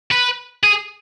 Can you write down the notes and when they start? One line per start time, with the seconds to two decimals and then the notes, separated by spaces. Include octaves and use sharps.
0.11 B4
0.64 G#4